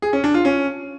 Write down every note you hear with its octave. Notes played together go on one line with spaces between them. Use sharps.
G#4
C#4
D4
F4
C#4